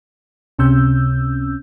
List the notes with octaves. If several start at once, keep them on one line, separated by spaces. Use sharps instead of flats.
C#2 C3 C#4 E6 G6